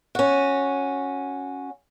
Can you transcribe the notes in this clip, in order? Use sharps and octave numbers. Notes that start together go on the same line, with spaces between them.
C#4 F#4